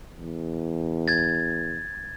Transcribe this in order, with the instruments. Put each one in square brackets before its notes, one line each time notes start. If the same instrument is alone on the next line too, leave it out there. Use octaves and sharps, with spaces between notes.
[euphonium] E2
[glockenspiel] G#6 A6